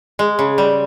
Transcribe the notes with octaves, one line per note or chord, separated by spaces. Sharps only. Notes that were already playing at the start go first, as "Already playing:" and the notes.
G#3
C#3
G3